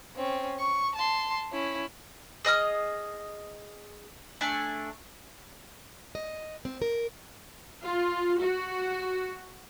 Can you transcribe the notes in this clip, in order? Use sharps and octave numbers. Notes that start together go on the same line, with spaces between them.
C4 C#4
C#6
A5 C6
C#4 E4
G#4 D#5 D#6 F6
A3 D4 G#5 A5
D#5
C4
A#4
F4
F#4